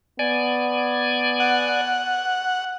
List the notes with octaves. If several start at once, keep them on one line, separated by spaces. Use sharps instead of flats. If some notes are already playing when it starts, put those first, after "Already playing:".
B3 D5 G#5
F#5